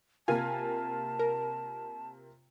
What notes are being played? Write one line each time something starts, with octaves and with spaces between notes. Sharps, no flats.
C3 A#3 F4 G#5 A5
A#4